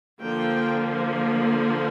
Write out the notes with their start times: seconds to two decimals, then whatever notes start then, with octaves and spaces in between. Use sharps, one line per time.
0.20 D3 F3 A#3 G5